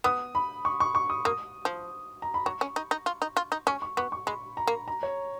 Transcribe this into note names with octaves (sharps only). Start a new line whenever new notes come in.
B3 D#6
B5
C#6
C#6
C#6
D#6
A#3 D#6
F3
A#5
B5
F#3 C#6
C#4
D#4
D#4
F4
D#4
F4
D#4
C#4 C#6
C#6
B3 C#6
C#6
G#3 B5
A#5
A#3
A#5
C#5